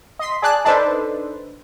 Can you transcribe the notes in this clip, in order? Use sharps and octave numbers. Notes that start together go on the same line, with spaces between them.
D#5 C6 B6
G#4 D5 A5 F#6
D4 D#4 A4 B4 C5